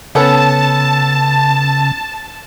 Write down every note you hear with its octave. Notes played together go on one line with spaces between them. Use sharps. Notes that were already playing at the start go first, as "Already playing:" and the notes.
C#3 B3 C#4 A4 A5